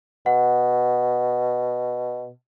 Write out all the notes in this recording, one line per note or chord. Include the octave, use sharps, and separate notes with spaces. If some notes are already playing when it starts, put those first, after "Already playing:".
B2 F#5